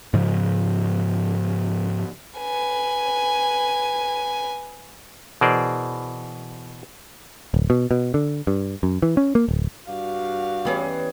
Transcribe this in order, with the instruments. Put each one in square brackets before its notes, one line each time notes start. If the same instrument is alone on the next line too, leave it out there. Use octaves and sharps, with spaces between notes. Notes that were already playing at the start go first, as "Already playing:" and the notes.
[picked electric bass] G#2 C#3 F3
[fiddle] B4 G#5
[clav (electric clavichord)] B2 E3 G#4 A#4 C5 D5
[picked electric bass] D1
B2
B2
D3
G2
F#2
E3
C#4
A#3
D1
[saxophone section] G2 D5 F5 [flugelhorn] F#4
[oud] E3 B3 C#4 [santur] G3 G#4